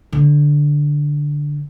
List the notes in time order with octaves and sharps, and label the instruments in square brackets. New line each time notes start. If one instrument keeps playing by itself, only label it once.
[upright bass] D3